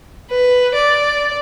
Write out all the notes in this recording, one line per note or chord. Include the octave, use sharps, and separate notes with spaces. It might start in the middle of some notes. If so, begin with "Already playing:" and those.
B4
D5